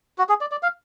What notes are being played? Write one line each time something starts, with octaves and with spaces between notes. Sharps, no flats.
F#4
G#4
D5
D5
F5